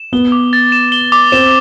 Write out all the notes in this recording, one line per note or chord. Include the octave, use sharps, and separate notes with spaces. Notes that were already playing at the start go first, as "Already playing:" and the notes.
Already playing: E7
B3 G7
D6
A6
E7
G7
D6
C4 E7